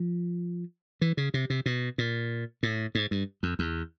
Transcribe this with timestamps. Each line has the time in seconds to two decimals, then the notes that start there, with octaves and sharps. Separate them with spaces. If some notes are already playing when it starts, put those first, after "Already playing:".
Already playing: F3
1.01 E3
1.17 C#3
1.34 C3
1.50 C3
1.66 B2
1.98 A#2
2.63 A2
2.95 G#2
3.11 G2
3.43 F2
3.59 E2